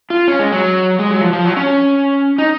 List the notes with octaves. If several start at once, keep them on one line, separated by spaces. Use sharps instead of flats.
F4
C#4
G#3
F#3
G#3
F#3
F3
F3
F#3
C#4
D#4